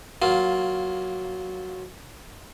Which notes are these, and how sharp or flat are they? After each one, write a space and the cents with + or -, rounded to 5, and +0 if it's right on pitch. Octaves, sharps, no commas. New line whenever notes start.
F#3 +0 A#3 +15 F4 +0